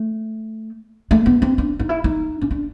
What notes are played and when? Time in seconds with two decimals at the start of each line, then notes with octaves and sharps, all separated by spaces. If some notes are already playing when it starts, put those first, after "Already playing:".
Already playing: A3
1.11 A3
1.26 B3
1.42 C4
1.58 D4
1.79 D#4
1.89 E4
2.04 D#4
2.41 C#4
2.51 D4